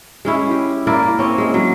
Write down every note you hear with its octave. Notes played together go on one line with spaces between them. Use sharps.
G#3 C#4 E4
G4
A#3 E4 A#4 D5
C4 C#4
G#3
F#3